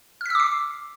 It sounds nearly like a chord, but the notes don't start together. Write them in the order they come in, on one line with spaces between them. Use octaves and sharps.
F6 B6 E6 D6 C7